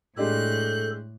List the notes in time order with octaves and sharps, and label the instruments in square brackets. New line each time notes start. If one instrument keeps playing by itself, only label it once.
[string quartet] A2 F#6 [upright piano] G#3 D4 G4 [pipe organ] A4 [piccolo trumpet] G6